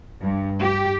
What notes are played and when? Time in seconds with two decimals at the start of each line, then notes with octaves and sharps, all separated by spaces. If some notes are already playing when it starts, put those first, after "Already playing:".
0.21 G2
0.60 G4